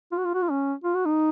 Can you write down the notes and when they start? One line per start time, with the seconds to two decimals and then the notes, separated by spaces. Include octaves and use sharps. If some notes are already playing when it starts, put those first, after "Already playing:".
0.12 F4
0.18 F#4
0.25 F4
0.34 F#4
0.42 F4
0.51 C#4
0.84 F4
0.95 F#4
1.06 D#4